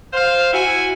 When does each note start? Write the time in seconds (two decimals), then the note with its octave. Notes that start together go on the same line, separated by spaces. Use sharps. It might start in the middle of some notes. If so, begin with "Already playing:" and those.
0.14 C5 F5
0.53 E4 F#4 E5 G#5